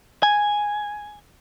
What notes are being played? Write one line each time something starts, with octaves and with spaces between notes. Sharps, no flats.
G#5